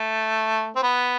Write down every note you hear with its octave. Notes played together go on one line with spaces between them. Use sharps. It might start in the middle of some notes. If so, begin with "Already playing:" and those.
Already playing: A3
C4
B3